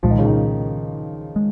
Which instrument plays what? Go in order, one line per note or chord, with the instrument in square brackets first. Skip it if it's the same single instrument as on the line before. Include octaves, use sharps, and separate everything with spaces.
[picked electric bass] C2 A#2 G#3 [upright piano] F3
[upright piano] D#3
C#3
D#3
[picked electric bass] G#3